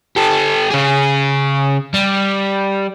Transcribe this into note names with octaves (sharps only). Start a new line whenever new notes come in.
G4 A4
C#3 G#4
G3